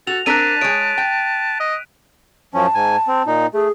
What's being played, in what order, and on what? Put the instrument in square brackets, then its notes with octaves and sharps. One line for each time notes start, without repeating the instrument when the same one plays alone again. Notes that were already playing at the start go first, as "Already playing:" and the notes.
[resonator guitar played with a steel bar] F#4 [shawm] A4 [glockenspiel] F7
[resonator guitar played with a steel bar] C4 D4 A#4 [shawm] A5 [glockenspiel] F#6 B6 D#7
[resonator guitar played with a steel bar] G#3 C#5 [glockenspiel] D7
[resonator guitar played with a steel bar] G5
[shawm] D#5
[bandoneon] F#2 F3 C#4 [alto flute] A5
[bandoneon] G#2 G#5
C4
A#2 D#4
[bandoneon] A3 [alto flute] G#4